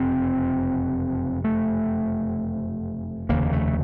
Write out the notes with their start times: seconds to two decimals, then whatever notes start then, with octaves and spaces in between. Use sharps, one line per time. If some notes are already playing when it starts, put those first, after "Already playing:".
Already playing: F#1 F2 C3 C4
1.44 A3
3.29 F1 D#2 C#3 A#3
3.53 A3